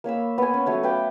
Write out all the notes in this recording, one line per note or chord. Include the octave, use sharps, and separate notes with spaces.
A#3 C#5 B5 E6
B3 G#5
C#4
F#3 A3 C#5 F#5
B4 F5 G5 D6